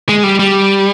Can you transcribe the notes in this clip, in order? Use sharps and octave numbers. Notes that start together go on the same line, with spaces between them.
G#3
G3
G3